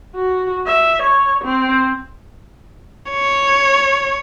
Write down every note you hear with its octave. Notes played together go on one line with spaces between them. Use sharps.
F#4
E5
C#5
C4
C#5